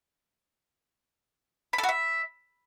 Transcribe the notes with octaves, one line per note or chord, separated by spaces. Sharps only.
B5
A4
F#4
E5